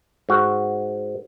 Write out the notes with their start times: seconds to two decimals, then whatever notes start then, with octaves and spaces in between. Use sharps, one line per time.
0.29 G#2 F#4